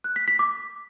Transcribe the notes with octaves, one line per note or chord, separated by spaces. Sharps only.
F#6
B6
B6
D6